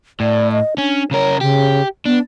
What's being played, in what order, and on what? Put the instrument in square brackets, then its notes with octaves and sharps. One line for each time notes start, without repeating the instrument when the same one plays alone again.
[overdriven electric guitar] A2 [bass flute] D5
[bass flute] D#5
[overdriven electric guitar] C#4 [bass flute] D4
[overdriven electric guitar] C#3 A#4 [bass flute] C#5
[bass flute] C#3 [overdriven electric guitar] G4
[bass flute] B3 [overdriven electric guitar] D4